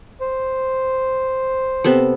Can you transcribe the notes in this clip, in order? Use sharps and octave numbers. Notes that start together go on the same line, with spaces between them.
C5
C3 B3 A4